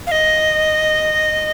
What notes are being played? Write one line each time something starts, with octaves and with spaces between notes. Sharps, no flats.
F5
D#5